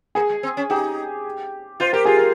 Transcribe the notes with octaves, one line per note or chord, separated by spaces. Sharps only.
A#3 G#4
G#3
C4
C#4
D#4 G4
F4 C5
G4 A#4
F4 G#4
A#4